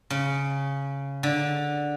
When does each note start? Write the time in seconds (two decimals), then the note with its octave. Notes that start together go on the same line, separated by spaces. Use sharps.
0.10 C#3
1.23 D3